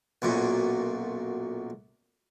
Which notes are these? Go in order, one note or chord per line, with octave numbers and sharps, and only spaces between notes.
B1 F#2 A#2